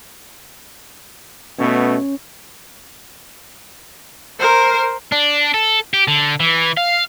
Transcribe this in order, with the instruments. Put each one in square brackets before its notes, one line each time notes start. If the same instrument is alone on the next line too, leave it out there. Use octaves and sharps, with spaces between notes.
[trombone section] B2 A3 B3 [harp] C#4
[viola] A#4 C5
[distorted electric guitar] D4
A4
G4
D3
E3
F5